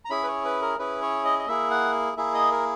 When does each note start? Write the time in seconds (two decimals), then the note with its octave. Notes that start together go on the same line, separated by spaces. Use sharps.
0.05 A#5
0.10 C#4 E4 G#4 B5
0.23 B4
0.28 C#5
0.45 B4
0.62 A#4
0.79 C#4 E4 G#4 B4
1.02 C#5
1.25 D#5
1.39 D#5
1.48 A#3 E4 G#4 E5
1.71 F#5
2.17 A#3 E4 G#4 E5
2.34 D#5
2.52 A#4